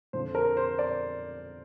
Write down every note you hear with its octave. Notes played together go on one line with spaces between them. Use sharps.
F2 D3 F3 C5
A#4
C5
D5